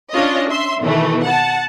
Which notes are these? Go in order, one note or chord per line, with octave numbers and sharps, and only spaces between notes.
C#4 D4 F4 D#5
E5 C6
B2 D#3 E3 A3
F#5 A5